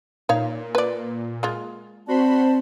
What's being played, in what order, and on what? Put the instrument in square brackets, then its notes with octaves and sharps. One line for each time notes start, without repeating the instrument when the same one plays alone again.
[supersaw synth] A#2 [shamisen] D#4 C#5 F5
[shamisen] B4 D5
G#3 F4
[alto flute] C4 [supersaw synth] F#4 B5 C6 [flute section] C5 D5 A5